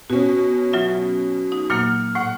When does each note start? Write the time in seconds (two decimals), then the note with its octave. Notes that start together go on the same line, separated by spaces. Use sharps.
0.10 B2 C#4 F#4
0.73 F#3 F4 E5
1.52 D#4
1.70 A#2 F#3 A#3 F6
2.15 A2 F#5